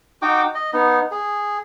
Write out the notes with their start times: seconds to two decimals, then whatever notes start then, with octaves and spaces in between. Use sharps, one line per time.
0.22 D#4 F#4 G5 D6
0.55 D#5
0.73 B3 D#4
1.11 G#4